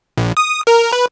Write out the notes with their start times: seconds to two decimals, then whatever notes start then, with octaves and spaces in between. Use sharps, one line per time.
0.17 A#1
0.37 D#6
0.67 A#4
0.93 B4